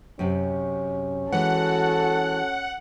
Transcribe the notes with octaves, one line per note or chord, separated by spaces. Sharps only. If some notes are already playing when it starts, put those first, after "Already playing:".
F#2 C3 C#4
E3 G#3 F#4 A4 F#5